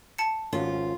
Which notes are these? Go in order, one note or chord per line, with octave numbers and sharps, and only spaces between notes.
A5 C#7
G#1 C#4 F4